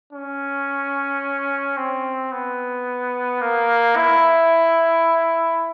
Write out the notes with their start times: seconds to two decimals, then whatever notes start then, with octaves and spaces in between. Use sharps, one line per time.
0.13 C#4
1.77 C4
2.32 B3
3.41 A#3
3.96 E4